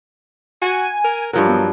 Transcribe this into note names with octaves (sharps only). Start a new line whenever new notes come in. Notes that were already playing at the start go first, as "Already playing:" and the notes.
F#4 G#5
A#4
G2 F3 F#3 A#4
B3